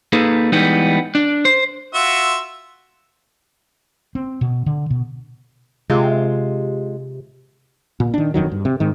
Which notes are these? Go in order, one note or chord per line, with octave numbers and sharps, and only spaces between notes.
A#3 D#4 G#4 A4 B4
E3 G3 G#3 B3 D#4
D4
C5
F4 F#4 E5
C4
B2
D3
B2
C3 G#3 F4
A#2
D#3 D4
E1 F2 D#3 F#3
G2
C3
G#2 D#3